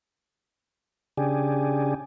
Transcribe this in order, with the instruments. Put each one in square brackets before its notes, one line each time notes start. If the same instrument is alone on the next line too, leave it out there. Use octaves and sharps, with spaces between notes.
[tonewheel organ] C#3 D4 G4 G#4